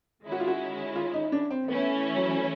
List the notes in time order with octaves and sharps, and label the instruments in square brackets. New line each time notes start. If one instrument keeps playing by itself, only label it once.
[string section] D#3 G#3 C#4 E4
[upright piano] F#4
F4
F#4
F4
D#4
D4
C4
[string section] E3 A3 C#4 E4 [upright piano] B3
[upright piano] F#3